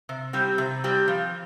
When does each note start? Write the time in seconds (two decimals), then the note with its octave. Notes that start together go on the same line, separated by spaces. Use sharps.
0.09 C3
0.33 G3 C4 G4
0.58 C3
0.84 G3 C4 G4
1.08 F3